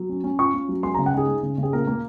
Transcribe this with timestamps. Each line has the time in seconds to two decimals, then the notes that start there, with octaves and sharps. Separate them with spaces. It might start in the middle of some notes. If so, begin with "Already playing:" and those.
Already playing: F#3
0.09 C#4
0.24 C#4
0.39 F4 C#6
0.54 C#4
0.69 F#3
0.83 G#3 C6
0.94 A#5
0.98 C#3
1.06 F#5
1.14 D#4 G#4
1.28 G#3
1.43 C#3
1.58 C#3 G#4
1.73 A#2 A#4
1.87 A#3